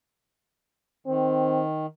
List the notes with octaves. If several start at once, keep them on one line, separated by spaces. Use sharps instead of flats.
D#3 C4